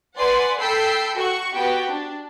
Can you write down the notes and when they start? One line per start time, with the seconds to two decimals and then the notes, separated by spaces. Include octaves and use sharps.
0.16 B4 D5 F#5 G#5 C6
0.59 A4 G5 B5 E6 G6 C7
1.15 F#4 C#6
1.53 B3 F#4 G4 G5
1.89 D4